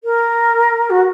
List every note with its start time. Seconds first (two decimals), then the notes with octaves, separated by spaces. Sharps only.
0.04 A#4
0.89 F#4